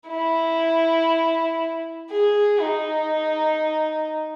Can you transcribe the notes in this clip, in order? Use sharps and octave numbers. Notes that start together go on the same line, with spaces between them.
E4
G#4
D#4